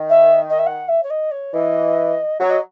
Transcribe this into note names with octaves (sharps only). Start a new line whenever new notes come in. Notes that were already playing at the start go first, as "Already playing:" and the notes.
Already playing: D#3
E5
D#5
E5
F#5
E5
C#5
D#5
C#5
E3 D#5
F#3 C#5
D#5